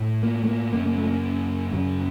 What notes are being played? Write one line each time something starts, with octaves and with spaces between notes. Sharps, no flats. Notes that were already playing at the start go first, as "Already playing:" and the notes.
Already playing: A2
A#3
A3
A#3
F#2 C#3 A#3
A#3
A3
A#3
F#2 C#3 F#3